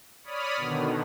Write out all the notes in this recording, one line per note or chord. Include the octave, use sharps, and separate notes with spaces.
C#5 D5 B5 D#6 F6
B2 D3 D#3